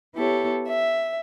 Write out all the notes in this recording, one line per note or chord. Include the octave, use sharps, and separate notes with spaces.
B3 E4 G4 A4 C#5
E5